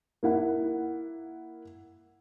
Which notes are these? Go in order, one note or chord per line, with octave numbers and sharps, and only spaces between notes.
A#3 E4 F#5